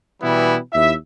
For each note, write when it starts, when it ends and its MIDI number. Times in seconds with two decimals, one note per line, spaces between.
0.22 0.57 47
0.22 0.57 52
0.22 0.57 55
0.22 0.57 59
0.22 0.57 64
0.73 0.94 39
0.73 0.94 64
0.73 0.94 76